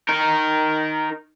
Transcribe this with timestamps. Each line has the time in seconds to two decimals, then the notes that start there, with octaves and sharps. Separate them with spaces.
0.09 D#4 A#4